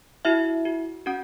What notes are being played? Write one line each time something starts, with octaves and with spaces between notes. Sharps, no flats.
E4 F#4 E5
F#4
C#4 F#4 F#5